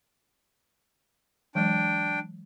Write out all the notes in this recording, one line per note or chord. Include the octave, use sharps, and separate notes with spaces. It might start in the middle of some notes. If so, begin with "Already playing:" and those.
E3 F#3 G#3 D4 G5